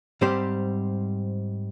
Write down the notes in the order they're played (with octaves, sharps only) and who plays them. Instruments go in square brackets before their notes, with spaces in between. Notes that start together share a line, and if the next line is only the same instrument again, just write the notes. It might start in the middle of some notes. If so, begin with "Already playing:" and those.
[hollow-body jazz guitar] G#2 G3 C4 G4 C5